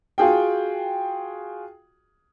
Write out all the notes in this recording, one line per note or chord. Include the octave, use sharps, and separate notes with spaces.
F4 F#4 G#4 G5